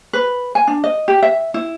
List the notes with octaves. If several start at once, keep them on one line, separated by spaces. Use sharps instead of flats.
B4
G#5
D4
D#5
G4
E5
E4